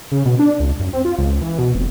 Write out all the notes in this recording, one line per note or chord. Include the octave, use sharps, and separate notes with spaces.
C#3
B2
D4
C#2
F#2
C4
F4
C#2
E3
B2
F1